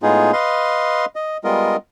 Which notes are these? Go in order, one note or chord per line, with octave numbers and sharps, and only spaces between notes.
A2 G#3 B3 D#4 F4 G#4
B4 D#5 F5 C6
D#5
G3 G#3 B3 F4 A#4 D#5